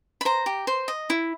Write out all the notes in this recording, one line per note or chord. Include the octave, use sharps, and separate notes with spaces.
B5
C5 A#5
G4
C5
D#5
E4